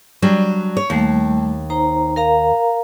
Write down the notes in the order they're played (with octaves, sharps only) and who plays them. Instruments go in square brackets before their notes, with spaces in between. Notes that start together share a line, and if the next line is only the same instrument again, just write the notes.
[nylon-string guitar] F#3 G3 D4
C#5
[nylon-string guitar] D#2 [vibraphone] G3 A3
[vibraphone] D#4 C5 A#5
A#4 F5 A#5